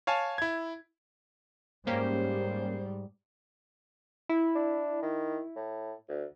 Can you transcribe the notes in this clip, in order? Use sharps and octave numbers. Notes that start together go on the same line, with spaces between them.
C#5 F5 G#5 A5
E4 G#6
G#2 G3 A#3 C#4 G4 C5
E4
D4
D#3
A2
D2